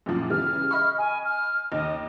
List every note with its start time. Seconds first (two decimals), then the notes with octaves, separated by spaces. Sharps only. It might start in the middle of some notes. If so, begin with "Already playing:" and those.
0.06 F#2 A#2 F3
0.30 C#3 E3 G3 F6
0.71 D#5 B5 C#6
0.98 G#5
1.24 F6
1.72 D#2 D#5